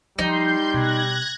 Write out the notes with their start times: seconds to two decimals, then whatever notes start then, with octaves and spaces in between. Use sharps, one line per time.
0.19 F3 G3 D#4 C6 G6
0.74 B2 F#6 G#6 A#6